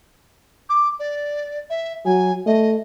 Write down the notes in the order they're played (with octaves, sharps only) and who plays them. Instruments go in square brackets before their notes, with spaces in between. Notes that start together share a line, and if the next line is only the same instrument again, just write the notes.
[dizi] D6
D5
E5
[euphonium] F#3 [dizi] G#5
[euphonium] A3 [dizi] D#5